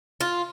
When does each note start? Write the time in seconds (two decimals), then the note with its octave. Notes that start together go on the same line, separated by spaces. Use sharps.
0.21 F4